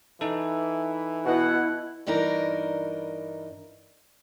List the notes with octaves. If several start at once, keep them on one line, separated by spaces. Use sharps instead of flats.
E3 D#4 A4
B2 E4 F#5
G2 E3 D4 D#4 A#4